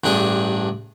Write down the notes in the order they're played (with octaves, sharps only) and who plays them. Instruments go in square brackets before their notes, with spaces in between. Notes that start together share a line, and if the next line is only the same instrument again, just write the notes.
[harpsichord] A1 G2 D4 G#4